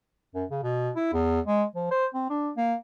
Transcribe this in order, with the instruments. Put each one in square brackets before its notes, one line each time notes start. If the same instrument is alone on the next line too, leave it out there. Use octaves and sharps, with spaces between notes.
[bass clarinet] F#2
C#3
B2
E4
E2
G#3
F3
C5
C4
D4
A#3